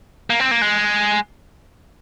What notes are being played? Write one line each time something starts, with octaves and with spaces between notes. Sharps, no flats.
A#3
C4
A#3
G#3